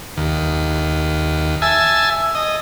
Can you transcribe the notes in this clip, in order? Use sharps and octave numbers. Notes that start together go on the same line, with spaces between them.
D#2
E5 G#5 A5
D#5